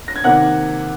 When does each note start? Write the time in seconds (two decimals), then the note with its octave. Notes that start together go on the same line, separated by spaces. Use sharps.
0.08 A#6
0.16 G#6
0.24 C3 D#3 A#3 F#5 F#6